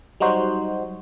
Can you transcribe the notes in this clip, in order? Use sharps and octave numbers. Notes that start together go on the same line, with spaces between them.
F#3 G3 D#4 F#4 C5